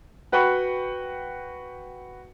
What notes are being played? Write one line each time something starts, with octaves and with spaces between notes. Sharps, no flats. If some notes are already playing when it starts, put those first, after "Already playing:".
F#4 B4 F#5 G5 B5 C#6